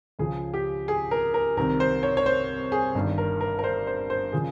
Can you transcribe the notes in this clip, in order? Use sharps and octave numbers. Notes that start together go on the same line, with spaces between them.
C#2 C#3 F3 G#4
G4
G#4
A#4
A#4
C2 C3 D#3 A#4
C5
C#5
C#5
C5
G#4
G1 G2 D#3
A#4
A#4
A#4
C5
C5
C5
C#3 F3 G#4